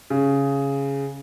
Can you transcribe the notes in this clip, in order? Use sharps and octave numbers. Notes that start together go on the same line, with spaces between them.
C#3